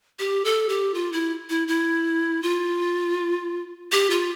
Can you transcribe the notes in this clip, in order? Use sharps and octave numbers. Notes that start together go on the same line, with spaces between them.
G4
A4
G4
F4
E4
E4
E4
F4
G4
F4